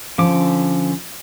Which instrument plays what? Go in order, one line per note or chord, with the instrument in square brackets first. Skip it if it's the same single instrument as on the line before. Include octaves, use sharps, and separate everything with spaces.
[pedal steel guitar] D3 C#4 D6 [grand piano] F3